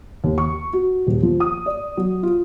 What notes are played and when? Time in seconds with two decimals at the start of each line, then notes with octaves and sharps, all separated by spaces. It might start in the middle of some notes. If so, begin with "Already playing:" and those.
0.24 D#2
0.38 C#6
0.73 F#4
1.07 D#1
1.23 F3
1.40 D#6
1.66 D5
1.97 F#3
2.23 F4